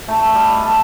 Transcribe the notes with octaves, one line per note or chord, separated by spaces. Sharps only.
A3
A4
G3
D#5
A4